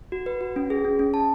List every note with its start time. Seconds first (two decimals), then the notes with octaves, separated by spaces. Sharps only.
0.12 F#4
0.26 B4
0.41 F#4
0.56 C#4
0.70 G#4
0.85 C#4
0.99 C#4
1.14 A5